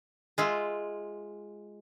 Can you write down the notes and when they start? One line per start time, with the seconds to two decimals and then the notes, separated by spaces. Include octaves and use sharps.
0.38 G#3 F4 E5